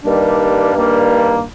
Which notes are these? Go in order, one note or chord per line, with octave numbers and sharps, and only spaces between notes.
G2 D#3 G3 A#3 D4
G2 D#3 G3 A#3 D4